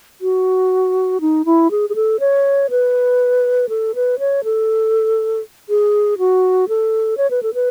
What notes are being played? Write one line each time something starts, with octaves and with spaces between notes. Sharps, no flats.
F#4
D#4
E4
G#4
G#4
A4
C#5
B4
A4
B4
C#5
A4
G#4
F#4
A4
C#5
B4
A4
B4